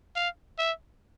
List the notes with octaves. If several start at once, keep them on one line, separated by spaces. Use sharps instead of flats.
F5
E5